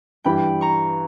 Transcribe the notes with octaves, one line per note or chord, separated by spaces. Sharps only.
G2 E3 G3 G5 B5
A#5 C#6